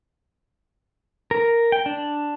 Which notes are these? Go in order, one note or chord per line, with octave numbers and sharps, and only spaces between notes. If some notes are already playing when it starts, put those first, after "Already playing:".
A#4
G5
D4